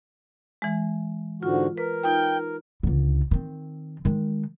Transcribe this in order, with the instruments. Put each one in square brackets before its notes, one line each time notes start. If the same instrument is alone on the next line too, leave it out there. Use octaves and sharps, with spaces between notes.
[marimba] E3 G#3
[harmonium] G#2 D3 F#4 [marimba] F4
[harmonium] A#4 [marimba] B4
[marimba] D#4 F4 F6 [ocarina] G5
[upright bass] C#2 D3
D#3 C4
D#3 G#3